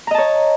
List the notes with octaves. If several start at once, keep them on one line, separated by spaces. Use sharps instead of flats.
C#5 D#5 A5 A#5